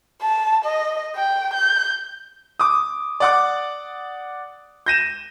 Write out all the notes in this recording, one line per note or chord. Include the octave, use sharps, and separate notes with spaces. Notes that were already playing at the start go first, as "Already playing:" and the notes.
A5
D#5
G5
G6
D6 D#6
D5 F#5 D6
G6 A#6 D#7 E7